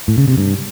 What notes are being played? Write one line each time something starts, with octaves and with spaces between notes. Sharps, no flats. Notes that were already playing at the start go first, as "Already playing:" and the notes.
A2
C#3
C3
G2